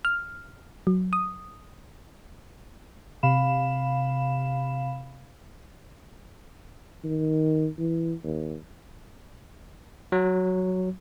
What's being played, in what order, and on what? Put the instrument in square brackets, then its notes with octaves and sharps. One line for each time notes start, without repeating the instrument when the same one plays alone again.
[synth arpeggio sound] F6
F#3
D#6
[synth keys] C3 F5 B5 E7
[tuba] D#3
E3
D#2
[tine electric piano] F#3